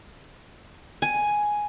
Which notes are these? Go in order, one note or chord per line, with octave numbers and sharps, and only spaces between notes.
G#5